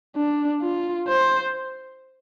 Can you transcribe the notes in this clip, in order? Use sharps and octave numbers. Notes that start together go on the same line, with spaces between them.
D4
F4
C5